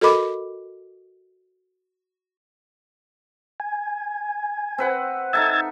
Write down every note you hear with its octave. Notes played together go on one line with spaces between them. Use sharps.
F#4 A4 A#4 D#5 B5 D6
G#5
C4 B4 F#5
D#4 A4 E5 E6 G#6 A6